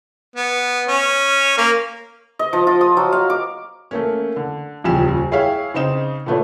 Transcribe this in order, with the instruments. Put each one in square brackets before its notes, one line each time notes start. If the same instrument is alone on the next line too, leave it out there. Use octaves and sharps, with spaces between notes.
[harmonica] B3
C#4
A#3
[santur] D#5
F3
F4
D#6
F#3
F5
D6
[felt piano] A3 A#3 C#4
D3
D#1 F2 C#3 G4 G#5 E7
E4 G#4 C#5 E5 F5 G5
C#3 C4 D#4 E7
A#2 D3 A3 B3 C#5